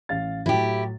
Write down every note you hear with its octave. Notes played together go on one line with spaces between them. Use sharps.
A1 F5 A6
A2 F#3 E4 G4